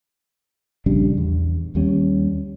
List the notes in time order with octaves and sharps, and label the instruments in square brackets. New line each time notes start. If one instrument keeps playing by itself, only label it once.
[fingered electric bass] A#1 C#3 G3 D4
E2
D#2 G3 C#4